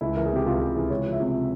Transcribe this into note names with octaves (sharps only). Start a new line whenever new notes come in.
C#2 E4
E3 A#4
G#4
C3 G4
C#2 F4
C#2 G4
E3 G#4
C#2 C#5
F3
E5
C3